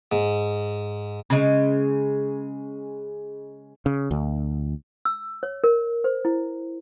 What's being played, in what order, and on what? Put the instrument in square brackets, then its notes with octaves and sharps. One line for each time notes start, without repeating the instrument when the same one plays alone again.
[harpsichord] G#2
[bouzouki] C#3 G#3
[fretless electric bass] C#3
D2
[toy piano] E6
C#5
A#4
C5
E4